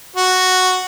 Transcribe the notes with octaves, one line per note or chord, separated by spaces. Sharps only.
F#4